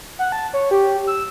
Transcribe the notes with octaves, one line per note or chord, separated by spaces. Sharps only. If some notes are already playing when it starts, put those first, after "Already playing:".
F#5
A5
C#5
G4
E6